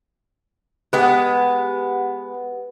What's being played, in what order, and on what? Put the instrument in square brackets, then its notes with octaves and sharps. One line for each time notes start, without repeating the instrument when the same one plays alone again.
[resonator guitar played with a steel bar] G#3 B3 [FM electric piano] G4 B4 F#5